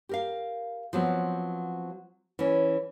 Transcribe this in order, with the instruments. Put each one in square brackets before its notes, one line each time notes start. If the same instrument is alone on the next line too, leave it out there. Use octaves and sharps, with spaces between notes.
[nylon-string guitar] G4 A#4 F5
F3 F#3 B3 C4
E3 C#4